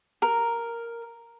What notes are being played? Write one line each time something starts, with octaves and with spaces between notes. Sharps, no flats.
A#4